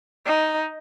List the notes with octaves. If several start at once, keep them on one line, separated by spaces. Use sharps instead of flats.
D#4